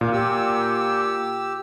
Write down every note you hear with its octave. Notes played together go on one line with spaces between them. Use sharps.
A#2 F5
G4 E6